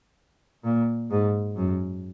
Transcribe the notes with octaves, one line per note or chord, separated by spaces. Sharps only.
A#2
G#2
F#2